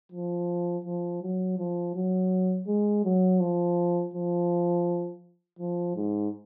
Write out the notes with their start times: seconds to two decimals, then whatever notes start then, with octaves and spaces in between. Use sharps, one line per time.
0.12 F3
0.85 F3
1.22 F#3
1.58 F3
1.95 F#3
2.67 G#3
3.05 F#3
3.40 F3
4.14 F3
5.59 F3
5.95 G#2